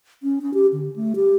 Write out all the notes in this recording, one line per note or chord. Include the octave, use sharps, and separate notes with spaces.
C#4
C#4
G4
D3
A3
G4